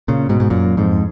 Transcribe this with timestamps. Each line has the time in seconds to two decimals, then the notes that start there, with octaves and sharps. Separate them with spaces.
0.08 A#2 C#3
0.29 G#2 B2
0.40 G#2
0.50 F#2 A#2
0.77 F2 G#2